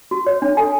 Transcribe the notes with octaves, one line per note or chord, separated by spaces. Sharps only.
F#4
C#5
D4
A4 G#5